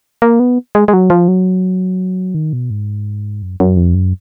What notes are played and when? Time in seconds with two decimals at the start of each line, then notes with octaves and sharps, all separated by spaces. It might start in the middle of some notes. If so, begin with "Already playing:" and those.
0.22 A#3
0.40 B3
0.75 G#3
0.88 G#3
0.93 F#3
1.10 F3
1.28 F#3
2.35 D#3
2.53 B2
2.70 G#2
3.42 F#2
3.60 F#2
3.77 F2
3.95 F#2